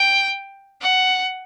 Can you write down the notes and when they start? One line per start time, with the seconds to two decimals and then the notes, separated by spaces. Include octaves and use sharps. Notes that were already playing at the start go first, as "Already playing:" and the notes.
Already playing: G5
0.81 F#5